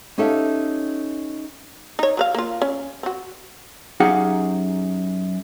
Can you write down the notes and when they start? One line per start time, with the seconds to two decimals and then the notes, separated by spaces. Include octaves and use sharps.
0.18 C#4 D#4 G4 A4 E5 F5
1.99 D#4 C#5
2.17 F#3 B4 F5
2.34 A#3 F4
2.62 C#4
3.03 C4 F#4
4.00 F#2 D#4 G4 G#4 F5 F#5